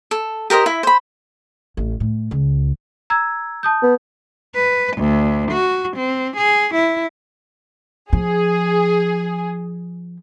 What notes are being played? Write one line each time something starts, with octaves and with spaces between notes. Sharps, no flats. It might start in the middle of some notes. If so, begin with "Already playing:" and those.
A4
G4 A#4 C5 D#5
E4 E5
C5 B5
A1
A2
C#2
A#5 E6 G#6
A5 D#6 G6
B3
B4
D2
F#4
C4
G#4
E4
F3 G#4